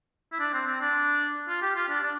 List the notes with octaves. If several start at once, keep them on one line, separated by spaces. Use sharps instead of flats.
E4
D4
C4
C4
D4
F4
G4
F4
D4
D4